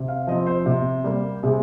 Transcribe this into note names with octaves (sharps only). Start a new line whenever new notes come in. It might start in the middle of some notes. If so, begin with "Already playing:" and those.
Already playing: C3
F5
F3 C4 D#5
C5
C3
G3 A#3
C3 G#4